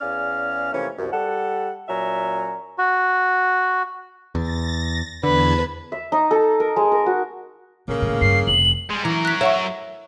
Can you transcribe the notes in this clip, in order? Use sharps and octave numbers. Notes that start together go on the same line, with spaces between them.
E2 C#4 G#4 D5 F5 F6
C3 E3 F3 A3 A#3 C#4
C2 F#2
G3 A4 F#5
A#2 F#3 C#4 E5 A#5
F#4
E2 A6 A#6
E2 D3 B4 A5 G#6
E5
D#4
A4
A#4
G#3
A#4
F#4
A2 C#3 A#3
A2 D#3
G2 C7
F1 F#7
G3 G#3
E3 F#3 A#4
F#6 B6
C#5 E5 F#5 C#6